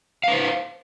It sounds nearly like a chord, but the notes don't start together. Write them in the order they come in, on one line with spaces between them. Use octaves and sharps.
F5 B4 C5